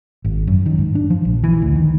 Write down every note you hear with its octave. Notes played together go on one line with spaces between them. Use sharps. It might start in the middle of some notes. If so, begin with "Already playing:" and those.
G#1
F#2
D#3
G#2
D4
F3
A#1
E3
D2
D#3